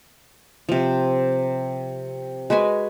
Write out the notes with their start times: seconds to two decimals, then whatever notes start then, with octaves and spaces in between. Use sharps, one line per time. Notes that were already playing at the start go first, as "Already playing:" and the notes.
0.69 C3 F3
2.50 G#3 F#4 B4 G#5